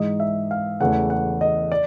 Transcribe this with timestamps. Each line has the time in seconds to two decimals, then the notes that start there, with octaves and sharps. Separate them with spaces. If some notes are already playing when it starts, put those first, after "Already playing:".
Already playing: G#2 E3 G#3 D#5
0.20 E5
0.51 F5
0.81 E2 C#3 E3 A3 F#5
1.10 F#5
1.41 D#5
1.72 D5